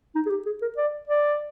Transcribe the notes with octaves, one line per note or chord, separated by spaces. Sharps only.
D#4
G#4
G4
G#4
A#4
D5
D5